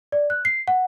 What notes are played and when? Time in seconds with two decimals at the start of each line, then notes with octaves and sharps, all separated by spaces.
0.12 D5
0.30 F#6
0.45 C7
0.68 F#5